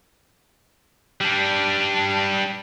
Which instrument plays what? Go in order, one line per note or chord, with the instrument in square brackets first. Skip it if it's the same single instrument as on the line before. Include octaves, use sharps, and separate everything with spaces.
[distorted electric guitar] G3 D4